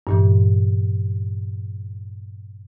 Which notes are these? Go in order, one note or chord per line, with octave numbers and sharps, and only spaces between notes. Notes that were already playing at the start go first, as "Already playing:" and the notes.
G2 A#2 E3